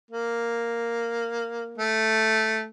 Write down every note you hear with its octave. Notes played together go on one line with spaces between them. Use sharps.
A#3
A3